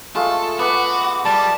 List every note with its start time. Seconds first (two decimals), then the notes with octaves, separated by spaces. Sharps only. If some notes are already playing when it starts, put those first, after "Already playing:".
0.15 G#3 A3 F4 A4
0.59 B3 F#4 B4 D6
1.25 G3 D5 A5